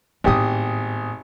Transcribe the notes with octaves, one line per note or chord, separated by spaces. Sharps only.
G#1 A2 B3 G4 D#6